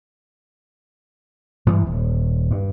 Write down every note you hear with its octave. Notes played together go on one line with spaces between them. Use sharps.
G2 E3 G3 G#3
D#1
G2